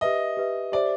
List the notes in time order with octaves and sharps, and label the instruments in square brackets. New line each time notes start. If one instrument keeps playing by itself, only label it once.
[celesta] G4 B4 E5 [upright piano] D#5
[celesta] G4 B4 E5
[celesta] G4 C5 E5 [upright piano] D5